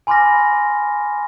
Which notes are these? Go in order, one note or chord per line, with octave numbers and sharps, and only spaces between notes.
G#5 B5 C6 D6 F6 A#6